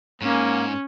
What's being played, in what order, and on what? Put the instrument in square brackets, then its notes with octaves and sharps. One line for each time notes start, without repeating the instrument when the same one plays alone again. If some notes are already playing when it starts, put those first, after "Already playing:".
[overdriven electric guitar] G#2 [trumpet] A#3 [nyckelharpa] C#4